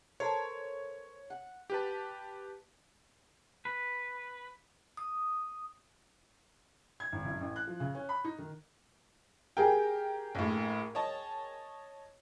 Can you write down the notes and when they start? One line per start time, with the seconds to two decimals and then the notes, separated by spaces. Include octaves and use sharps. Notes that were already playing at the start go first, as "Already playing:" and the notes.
0.20 A4 A#4 C5 C#5
1.30 F#5
1.70 G4 B4 A5
3.65 B4
4.97 D#6
7.00 G#6
7.12 G#1
7.25 F#1
7.41 A1
7.56 F#6
7.67 F3
7.80 C#3
7.95 C#4
8.09 B5
8.24 D#4
8.38 D#3
9.57 G4 G#4 A#4 G5
10.35 A#1 A2
10.95 C#5 D#5 A5